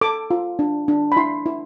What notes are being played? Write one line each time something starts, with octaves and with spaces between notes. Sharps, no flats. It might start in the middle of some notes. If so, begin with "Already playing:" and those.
A4 D6
F4
D4
D4
B5
E4 C6
E4